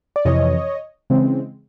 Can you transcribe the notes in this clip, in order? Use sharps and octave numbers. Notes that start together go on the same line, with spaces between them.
D5
F2 C3 E3 C#5 D#5
C#3 E3 G#3 C4